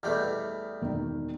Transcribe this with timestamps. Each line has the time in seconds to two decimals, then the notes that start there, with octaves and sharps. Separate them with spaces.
0.03 E2 G3 A3 B4 D#5 F6
0.82 E1 D#3